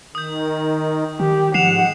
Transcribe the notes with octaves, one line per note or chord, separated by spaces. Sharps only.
D#3 D#6 G6
D#3 G4
G#2 F3 F#5 C7 E7 F7